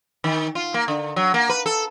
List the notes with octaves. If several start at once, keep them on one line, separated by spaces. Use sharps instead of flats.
D#3
F4
A#3
D3
F#3
A#3
B4
A4